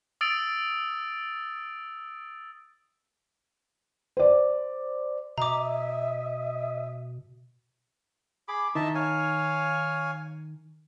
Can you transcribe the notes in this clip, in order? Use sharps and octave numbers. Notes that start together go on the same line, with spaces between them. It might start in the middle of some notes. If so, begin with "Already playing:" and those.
D#6 E6 A6 D7
C5 D5
B2 D#5 E5 A#5 D6
G#4 B5 D6
D#3 D#5 E5 A5
C#5 F5 G#5